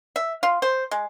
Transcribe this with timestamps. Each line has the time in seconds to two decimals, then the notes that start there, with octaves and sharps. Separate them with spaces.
0.16 E5
0.43 F4
0.62 C5
0.91 G#3